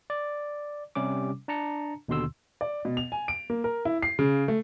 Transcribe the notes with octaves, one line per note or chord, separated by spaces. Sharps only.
D5
C3 G3 C#4 D6
D4 A5 A#5 C#7
D#2 B2 D3 C6 E6
D5
B2
F7
G#5
D7
A#3
A#4
E4
C7
C#3
A3